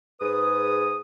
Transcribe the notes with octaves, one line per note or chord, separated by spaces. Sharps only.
G#2 G#4 B4 D#6